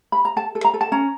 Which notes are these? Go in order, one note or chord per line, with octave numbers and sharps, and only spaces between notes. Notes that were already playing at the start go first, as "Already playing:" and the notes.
B5
A#5
A4 A5
A4
A#5
A4
A5
C#4 A#5